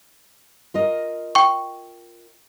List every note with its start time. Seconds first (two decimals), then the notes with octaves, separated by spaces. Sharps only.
0.74 F4 A#4 D#5
1.35 G5 C#6